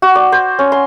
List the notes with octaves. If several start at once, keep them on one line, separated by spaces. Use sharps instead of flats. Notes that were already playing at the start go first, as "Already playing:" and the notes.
F#4
D5
C5
C#4
C6